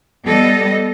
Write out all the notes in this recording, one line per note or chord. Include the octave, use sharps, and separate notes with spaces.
G3 B3 A4 D#5